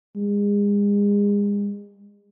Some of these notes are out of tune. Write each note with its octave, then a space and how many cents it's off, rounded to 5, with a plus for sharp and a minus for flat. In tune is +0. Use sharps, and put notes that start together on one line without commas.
G#3 -35